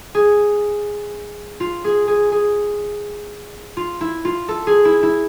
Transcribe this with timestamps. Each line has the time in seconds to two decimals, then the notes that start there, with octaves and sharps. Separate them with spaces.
0.15 G#4
1.60 F4
1.84 G#4
2.08 G#4
2.32 G#4
3.77 F4
4.01 E4
4.25 F4
4.48 A4
4.67 G#4
4.85 E4
5.03 E4